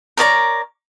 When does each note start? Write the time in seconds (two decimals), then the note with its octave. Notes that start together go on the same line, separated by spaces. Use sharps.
0.17 A#4 C#5 D5 A#5